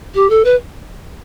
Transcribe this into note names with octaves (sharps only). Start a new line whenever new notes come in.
G4
A4
B4